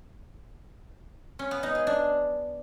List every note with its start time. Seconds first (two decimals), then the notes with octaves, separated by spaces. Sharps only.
1.39 C#4
1.51 B3
1.63 D#4
1.75 G#4
1.87 D4